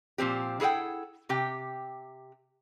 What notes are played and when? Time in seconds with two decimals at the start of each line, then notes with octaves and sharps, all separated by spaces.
0.18 A#2 F3 C4 G4
0.60 E4 G#4 A4 F#5 G5
1.29 C3 G4 G5